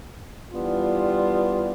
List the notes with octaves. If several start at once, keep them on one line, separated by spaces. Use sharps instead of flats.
E3 G3 B3 D4 F4